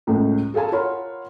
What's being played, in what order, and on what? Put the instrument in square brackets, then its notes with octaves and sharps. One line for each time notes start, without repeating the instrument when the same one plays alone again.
[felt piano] C#2 A2 C#3
G#4 A4 F5 G#5 A5
F4 A#4 C#5 F#5 B5